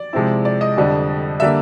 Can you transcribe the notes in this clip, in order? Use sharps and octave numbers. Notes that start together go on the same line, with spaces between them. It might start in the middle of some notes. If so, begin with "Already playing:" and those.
Already playing: D5
C3 F3 G#3 C4 E4
D5
D#5
F2 D3 G3
D3 G3 A#3 E5